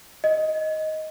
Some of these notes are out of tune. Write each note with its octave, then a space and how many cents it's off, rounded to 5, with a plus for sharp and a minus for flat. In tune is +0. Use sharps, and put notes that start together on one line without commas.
D#5 +10